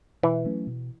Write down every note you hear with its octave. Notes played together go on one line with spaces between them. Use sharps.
B2 E3
F#3 A3 C#4
B2